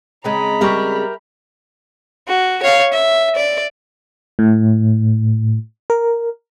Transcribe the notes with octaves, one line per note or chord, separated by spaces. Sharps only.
C#3 G#3 C4 A#5 B5
G3 G4 A#4 E5 C#6
F#4
C#5 F5
E5
D5
A2
A#4